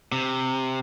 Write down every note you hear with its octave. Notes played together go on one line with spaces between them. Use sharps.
C3